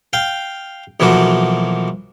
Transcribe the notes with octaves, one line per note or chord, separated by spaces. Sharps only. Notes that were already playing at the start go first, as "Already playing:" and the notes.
F5 G5
B1 E3 F3 A#3 F#4